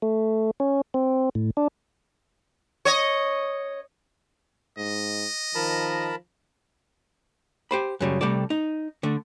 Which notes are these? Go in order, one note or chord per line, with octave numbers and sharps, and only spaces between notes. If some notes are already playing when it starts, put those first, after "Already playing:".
A3
C#4
C4
A2
D4
C#5 D#5
G#2 D#5
D#3 F3 A#4 A5 B5
G4 C5 B5
F#2 C#3 G3
C3 G3 A3 A4 D5
D#4
D3 A3